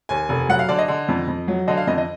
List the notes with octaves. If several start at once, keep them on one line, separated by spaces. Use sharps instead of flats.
D#2 G#5
F1
F#3 F#5
F5
D3 D5
D#5
D3
F2
F2
F#3
D3 D#5
F5
F2 D#5
D#5